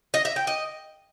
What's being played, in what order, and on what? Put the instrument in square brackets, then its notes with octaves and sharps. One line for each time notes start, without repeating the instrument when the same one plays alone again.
[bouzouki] D#5
E5
G5
D#5